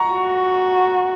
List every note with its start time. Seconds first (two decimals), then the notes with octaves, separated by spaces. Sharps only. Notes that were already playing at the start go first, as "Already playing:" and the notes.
Already playing: F#5 A#5 C#6
0.11 F#4